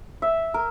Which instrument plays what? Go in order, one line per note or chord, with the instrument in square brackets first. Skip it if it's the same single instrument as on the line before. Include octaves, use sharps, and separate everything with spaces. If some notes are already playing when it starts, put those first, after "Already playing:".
[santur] E5
A#4